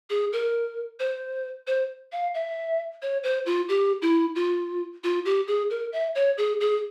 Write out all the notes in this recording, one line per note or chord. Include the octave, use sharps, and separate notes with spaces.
G#4
A#4
C5
C5
F5
E5
C#5
C5
F4
G4
E4
F4
F4
G4
G#4
A#4
E5
C#5
G#4
G#4